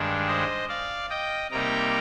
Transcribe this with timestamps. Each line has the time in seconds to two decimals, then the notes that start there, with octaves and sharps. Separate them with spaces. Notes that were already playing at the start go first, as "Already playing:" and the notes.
Already playing: G2 D#3 G#3 D4
0.28 C5 D#5
0.69 D5 F5
1.10 D#5 G5
1.51 C3 G3 A#3 D#4 G5 A#5